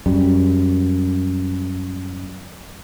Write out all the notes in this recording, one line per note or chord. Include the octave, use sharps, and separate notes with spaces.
F#2 G3